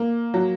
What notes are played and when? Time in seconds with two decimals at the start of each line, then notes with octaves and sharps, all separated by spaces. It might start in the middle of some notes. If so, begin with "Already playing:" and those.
Already playing: A#3
0.34 F#3